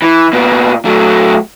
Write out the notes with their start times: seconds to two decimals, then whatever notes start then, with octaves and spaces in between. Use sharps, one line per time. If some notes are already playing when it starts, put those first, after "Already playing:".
0.02 E3
0.33 A#2 B3
0.85 F#3 A3